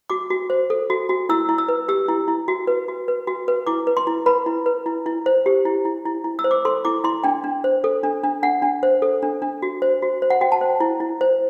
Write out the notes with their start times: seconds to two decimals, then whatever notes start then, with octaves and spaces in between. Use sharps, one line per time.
0.10 F#4 D6
0.30 F#4
0.50 C5
0.70 A4
0.90 F#4
1.09 F#4
1.29 E4 E6
1.49 E4
1.58 E6
1.68 B4
1.88 G4 E6
2.08 E4
2.28 E4
2.48 F#4
2.67 B4
2.88 F#4
3.08 B4
3.27 F#4
3.48 B4
3.67 E4 D6
3.87 B4
3.97 C6
4.07 E4
4.26 B4 B5
4.46 E4
4.66 B4
4.86 E4
5.06 E4
5.26 C5
5.46 G4
5.65 E4
5.85 E4
6.06 E4
6.24 E4
6.39 E6
6.44 C5
6.51 D6
6.65 A4 C6
6.85 E4 D6
7.04 E4 C6
7.24 D4 G5
7.44 D4
7.64 C5
7.84 A4
8.04 D4
8.24 D4
8.43 D4 F#5
8.62 D4
8.83 C5
9.02 A4
9.22 D4
9.42 D4
9.62 F#4
9.82 C5
10.02 F#4
10.22 C5
10.30 F#5
10.41 F#4 G5
10.52 A5
10.61 C5
10.80 E4
11.00 E4
11.21 C5